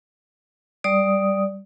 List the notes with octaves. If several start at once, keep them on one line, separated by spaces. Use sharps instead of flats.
G3 D5 D#6